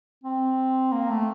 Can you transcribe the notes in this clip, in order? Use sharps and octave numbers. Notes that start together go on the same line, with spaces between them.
C4
A#3
A3